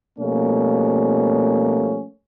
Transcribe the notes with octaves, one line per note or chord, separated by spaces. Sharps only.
B2 F3 G3 A3 A#3 C#4